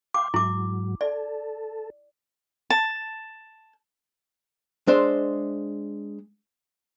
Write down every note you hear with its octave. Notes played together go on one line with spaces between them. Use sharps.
F5 G5 C6 D6
G#2 F#3 E4 D6
A4 D5
A5
G#3 D4 C5 E5